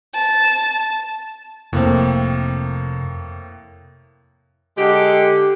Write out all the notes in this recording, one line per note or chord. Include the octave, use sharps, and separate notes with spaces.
A5
F1 A2 A#3 C4
D3 G#3 G4